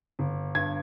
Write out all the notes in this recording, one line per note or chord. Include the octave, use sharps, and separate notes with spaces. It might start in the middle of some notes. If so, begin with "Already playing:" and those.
G1
G2 G#6